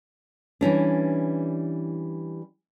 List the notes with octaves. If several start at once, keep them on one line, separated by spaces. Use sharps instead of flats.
E3 G3 C#4 D4